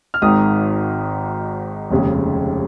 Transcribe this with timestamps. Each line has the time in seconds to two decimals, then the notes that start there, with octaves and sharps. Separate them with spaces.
0.14 F6
0.22 G#1 G#2 D#3 D#6
1.91 F1 D#2 C#3 G#3